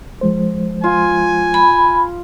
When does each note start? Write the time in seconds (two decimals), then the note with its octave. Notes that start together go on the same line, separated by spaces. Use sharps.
0.21 F3 G#3 C5
0.84 F4 G#5
1.54 B5